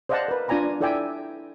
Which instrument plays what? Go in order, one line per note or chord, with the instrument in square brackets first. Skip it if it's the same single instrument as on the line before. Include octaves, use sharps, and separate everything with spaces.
[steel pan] C5 D5 D#5 F5 F#5 A5
A#4 B4
D4 F4 D5 G#5 A#5 B5
E4 A4 D5 E5 G5 G#5